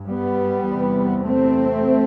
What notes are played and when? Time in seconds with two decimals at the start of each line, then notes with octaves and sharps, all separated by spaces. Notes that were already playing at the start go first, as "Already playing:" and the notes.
Already playing: G2
0.09 G3 B3
0.68 E2 C3
1.25 A3 C4